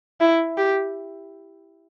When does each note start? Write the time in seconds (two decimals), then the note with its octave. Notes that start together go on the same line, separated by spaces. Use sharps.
0.21 E4
0.57 G4